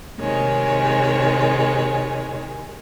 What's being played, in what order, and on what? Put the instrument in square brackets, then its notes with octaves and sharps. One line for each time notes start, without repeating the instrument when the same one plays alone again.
[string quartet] C3 D#3 G#3 C#5